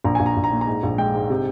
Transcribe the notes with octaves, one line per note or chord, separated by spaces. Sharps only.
A#1 A#5
A#1 G#5
A#5
A#1
A#5
A#2
A#5
G#2
A#1
G#3 G5
G#2
C3